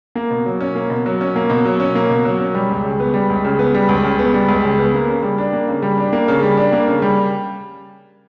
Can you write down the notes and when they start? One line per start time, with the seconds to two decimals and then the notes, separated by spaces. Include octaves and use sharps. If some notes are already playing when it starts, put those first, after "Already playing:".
0.16 A#3
0.30 B2
0.46 F#3
0.60 C#4
0.75 A#3
0.90 B2
1.06 F#3
1.21 C#4
1.36 A#3
1.50 B2
1.65 F#3
1.80 C#4
1.95 A#3
2.10 B2
2.25 F#3
2.40 C#4
2.54 G3
2.70 C#2
2.84 C#3
3.00 B3
3.14 G3
3.30 C#2
3.44 C#3
3.59 B3
3.75 G3
3.89 C#2
4.03 C#3
4.19 B3
4.34 G3
4.49 C#2
4.64 C#3
4.79 B3
4.94 A#3
5.08 C#3
5.23 G3
5.38 D4
5.53 A#3
5.68 C#3
5.82 G3
5.98 D4
6.13 A#3
6.28 C#3
6.43 G3
6.57 D4
6.72 A#3
6.88 C#3
7.02 G3